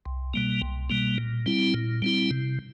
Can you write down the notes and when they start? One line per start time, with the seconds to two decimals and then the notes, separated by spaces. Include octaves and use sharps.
0.06 C2
0.34 B2 G3 A#3
0.61 C2
0.90 B2 G3 A#3
1.18 A#2
1.46 G3 C4 E4
1.74 A#2
2.02 G3 C4 E4
2.31 C3